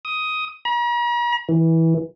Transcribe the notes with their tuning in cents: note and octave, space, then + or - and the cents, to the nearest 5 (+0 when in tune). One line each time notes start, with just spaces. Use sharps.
D#6 +10
A#5 +45
E3 -15